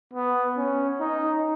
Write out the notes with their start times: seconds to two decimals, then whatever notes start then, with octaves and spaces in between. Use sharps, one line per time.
0.13 B3
0.57 C#4
1.00 D#4